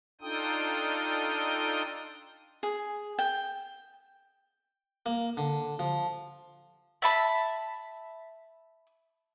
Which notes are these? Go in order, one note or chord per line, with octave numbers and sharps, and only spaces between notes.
D4 D#4 F4 A4 G5 D#6
G#4
G5
A#3
D3
F3
E5 A5 B5